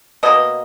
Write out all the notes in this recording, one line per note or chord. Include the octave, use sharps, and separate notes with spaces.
B2 A#3 D#5